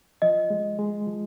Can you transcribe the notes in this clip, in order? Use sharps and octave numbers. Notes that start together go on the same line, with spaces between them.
F3 D#5
G#3
G#3
F3